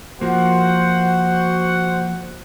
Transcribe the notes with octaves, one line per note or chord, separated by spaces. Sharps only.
F3 A#3 F#4 C5 F#5